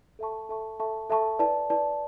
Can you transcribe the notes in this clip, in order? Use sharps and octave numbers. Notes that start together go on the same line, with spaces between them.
A4 E5 A5 C#6
A4 E5 A5 C#6
A4 E5 A5 C#6
A4 E5 A5 C#6
E4 B4 D5 A5
E4 B4 D5 A5